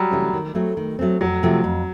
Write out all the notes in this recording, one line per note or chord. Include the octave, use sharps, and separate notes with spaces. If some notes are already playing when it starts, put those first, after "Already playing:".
Already playing: F#3 G3
C3 E3 A3 C#4
D#3
F#3 A3 C4
D#3
F#3 A3 C4
F2 F#3
C3 F3 A3
F2